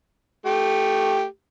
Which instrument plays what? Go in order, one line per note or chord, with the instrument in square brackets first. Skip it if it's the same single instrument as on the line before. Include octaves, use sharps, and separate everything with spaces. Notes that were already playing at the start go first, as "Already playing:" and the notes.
[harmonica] A3 G4